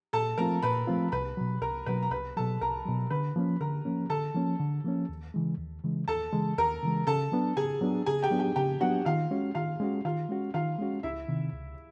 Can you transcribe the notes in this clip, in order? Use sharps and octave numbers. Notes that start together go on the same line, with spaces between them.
A#2 A4 A5
F3 A3 C4 F4 A#4 A#5
A#2 B4 B5
F3 A3 C4 F4
C2 B4 B5
B2 F#3
C2 A#4 A#5
B2 F#3 B4 B5
A#5
C2 B4 B5
B2 F#3 A4 A5
C2 A#4 A#5
B2 F#3
D3 B4 B5
F3 A#3 C#4
D3 A#4 A#5
F3 A#3 C#4
D3 A4 A5
F3 A#3 C#4
D3
F3 A#3 C#4
D#2
C#3 E3 G#3
D#2
C#3 E3 G#3
D#2 A4 A5
C#3 E3 G#3
D#2 A#4 A#5
C#3 E3 G#3
C#3 A4 A5
F#3 B3 D4
C#3 G#4 G#5
F#3 B3 D4
C#3 G#4 G#5
G4 G5
F#3 B3 D4
G4 G5
C#3 G4 G5
F#3 B3 D4 F#4 F#5
D#3 F4 F5
G#3 C#4 F#4
D#3 F4 F5
G#3 C#4 F#4
D#3 F4 F5
G#3 C#4 F#4
D#3 F4 F5
G#3 C#4 F#4
C#2 E4 E5
C3 D#3
C#2